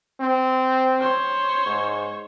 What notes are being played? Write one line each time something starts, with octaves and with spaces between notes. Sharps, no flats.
C4
C5 C#5
G#2